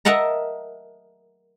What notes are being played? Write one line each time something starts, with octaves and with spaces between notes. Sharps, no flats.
A#4 D#5 E5 F#5 A5 A#5